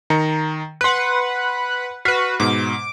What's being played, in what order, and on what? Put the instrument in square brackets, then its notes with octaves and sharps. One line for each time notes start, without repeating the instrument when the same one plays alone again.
[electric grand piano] D#3 A#5 C#7
[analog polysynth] B4 F#5 [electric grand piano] C6 F#6
[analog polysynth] F#4 B4 [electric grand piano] F6 B6 C7
[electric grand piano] G#2 B2 [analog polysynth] D6